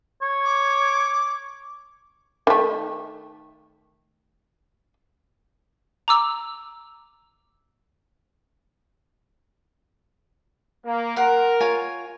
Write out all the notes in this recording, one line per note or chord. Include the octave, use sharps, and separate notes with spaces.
C#5
D6
D#3 A3
A#5 D6 E6
A#3
A#4 F#5 C6
F4 C#5 G#5